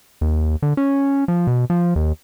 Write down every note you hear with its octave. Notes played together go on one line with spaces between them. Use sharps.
D#2
D3
C#4
F3
B2
F3
D#2